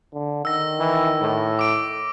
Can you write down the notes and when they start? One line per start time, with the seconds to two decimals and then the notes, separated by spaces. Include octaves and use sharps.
0.14 D3
0.45 D#3 E6 A#6
0.80 E3
1.21 A2
1.59 D6 D7